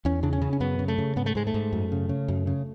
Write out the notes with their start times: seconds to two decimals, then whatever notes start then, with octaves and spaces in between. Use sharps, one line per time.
0.05 E2 C#4
0.23 C#3 D4
0.33 C#4
0.42 C#3
0.53 C#4
0.60 F#2 B3
0.79 C#3
0.88 A3
0.98 C#3
1.16 G#2 B3
1.26 A3
1.35 G#2 G#3
1.47 A3
1.54 G#2
1.73 F#2
1.92 C#3
2.09 C#3
2.28 F#2
2.47 C#3